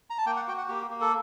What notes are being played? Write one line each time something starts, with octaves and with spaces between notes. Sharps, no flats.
A#5
A5
A#3 G5
F#5
F#4 G5
F#5
A#3 G4
A#3
A4